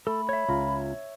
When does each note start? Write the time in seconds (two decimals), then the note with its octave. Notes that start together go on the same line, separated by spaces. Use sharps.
0.07 A3 A4 B5
0.29 C#5 E5
0.49 C#2 F4 A#5